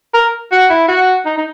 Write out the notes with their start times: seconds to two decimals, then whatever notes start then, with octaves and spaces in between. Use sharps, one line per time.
0.14 A#4
0.52 F#4
0.70 E4
0.88 F#4
1.26 D#4
1.38 D#4